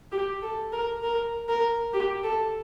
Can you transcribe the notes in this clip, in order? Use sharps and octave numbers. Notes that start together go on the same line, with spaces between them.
G4
A4
A#4
A#4
A#4
G4
A4